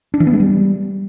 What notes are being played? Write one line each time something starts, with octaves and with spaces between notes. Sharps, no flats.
D4
E3
B3
G#3
G3